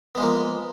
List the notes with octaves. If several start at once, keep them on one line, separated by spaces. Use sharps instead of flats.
F3 G#3 A#3 B3